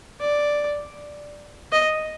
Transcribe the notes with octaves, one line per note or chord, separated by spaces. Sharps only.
D5
D#5